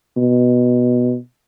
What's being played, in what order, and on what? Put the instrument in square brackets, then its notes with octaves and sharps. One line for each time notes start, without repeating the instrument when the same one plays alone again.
[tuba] B2